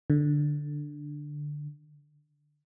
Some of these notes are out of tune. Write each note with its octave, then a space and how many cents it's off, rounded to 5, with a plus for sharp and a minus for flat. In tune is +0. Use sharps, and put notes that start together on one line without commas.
D3 +5